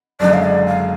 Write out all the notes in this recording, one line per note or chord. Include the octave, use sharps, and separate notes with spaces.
F#1 F#2 D3 G#3 D5
F5
D5
F5